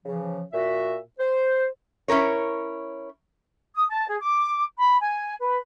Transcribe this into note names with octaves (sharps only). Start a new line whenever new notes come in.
C#3 E3 F3
A#2 F#4 E5
C5
C#4 E4 A#4 C#5
D#6
A5
G#4
D6
B5
G#5
B4